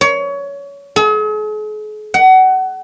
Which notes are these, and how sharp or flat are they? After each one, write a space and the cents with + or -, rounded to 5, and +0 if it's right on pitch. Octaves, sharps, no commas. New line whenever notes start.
C#5 +25
G#4 +45
F#5 +25